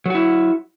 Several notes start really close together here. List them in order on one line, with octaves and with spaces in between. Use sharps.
F#3 F#4 E4